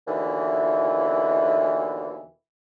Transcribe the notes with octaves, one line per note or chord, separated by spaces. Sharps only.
D#2 B2 D3 E3